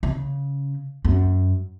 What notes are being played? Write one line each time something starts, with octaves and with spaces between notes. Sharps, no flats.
C#3
F#2